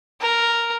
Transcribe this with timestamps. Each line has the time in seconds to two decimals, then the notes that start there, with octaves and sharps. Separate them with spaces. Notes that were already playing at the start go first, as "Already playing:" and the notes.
0.21 A#4